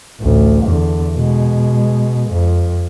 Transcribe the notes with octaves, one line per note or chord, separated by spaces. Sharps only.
A1 D2
E2 D3
B2 G#3
F2